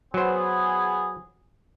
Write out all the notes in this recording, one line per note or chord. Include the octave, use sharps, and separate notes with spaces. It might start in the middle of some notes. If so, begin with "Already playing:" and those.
F#3 B3 G#4 C5